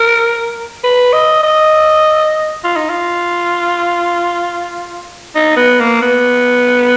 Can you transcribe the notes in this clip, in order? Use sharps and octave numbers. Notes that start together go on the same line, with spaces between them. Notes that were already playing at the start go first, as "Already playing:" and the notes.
Already playing: A#4
B4
D#5
D#5
F4
D#4
F4
D#4
B3
A#3
B3